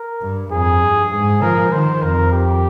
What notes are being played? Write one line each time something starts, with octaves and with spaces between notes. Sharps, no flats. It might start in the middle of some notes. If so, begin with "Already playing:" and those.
Already playing: A#4
G2
F2 G#4
G2
G#2 G#4
F3 A#4
D#3 C5
F2 A#4
G4